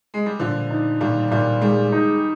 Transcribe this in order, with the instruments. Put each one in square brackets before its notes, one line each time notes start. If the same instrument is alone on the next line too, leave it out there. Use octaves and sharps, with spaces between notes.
[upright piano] G#3
G3
[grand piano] A#2 [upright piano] D3 F3
[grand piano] D#4
[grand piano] A#2 [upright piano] D#3 G3
[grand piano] A#2 [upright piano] D#3 G3
[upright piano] D#3 G3 [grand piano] G#3
[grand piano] D#4